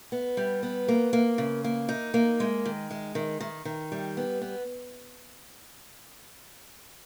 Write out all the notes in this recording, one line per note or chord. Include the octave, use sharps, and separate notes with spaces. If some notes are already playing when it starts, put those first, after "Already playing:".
B3
G3
B3
A#3
A#3
C#3
A#3
D#4
A#3
G#3
D#3
G#3
D#3
D#3
D#3
G3
B3
B3